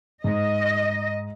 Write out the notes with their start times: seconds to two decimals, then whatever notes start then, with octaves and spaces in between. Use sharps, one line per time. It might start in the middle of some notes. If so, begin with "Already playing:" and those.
0.24 G#2 D#5